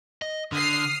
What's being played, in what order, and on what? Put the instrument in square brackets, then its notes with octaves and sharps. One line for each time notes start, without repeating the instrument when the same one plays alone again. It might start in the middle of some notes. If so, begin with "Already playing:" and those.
[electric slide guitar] D#5
[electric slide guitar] D3 [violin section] D#6 F6 C7